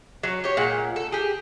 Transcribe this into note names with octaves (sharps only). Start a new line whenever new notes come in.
F#3 C#4
G4 C#5
A#2 G#3 F#5
A4
G4 G#4